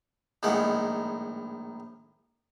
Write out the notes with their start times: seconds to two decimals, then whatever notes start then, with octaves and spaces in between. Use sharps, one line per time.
0.43 A#1 A2 D#3 G#3 F#5